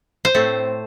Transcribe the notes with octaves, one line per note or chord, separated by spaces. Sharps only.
C5
A2 A3 C4